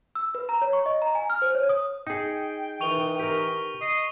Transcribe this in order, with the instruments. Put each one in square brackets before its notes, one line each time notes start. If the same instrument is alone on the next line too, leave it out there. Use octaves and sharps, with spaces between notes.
[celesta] E6
B4
A#5
C#5
C#6
D#5
A#5
G#5
F6
C5
C#5
D#6
[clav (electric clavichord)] D#4 G#4 [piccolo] G5
[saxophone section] D#3 E3 [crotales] C#6 F7 G7
[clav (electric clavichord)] G4 A#4
[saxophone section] D#5 [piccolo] C7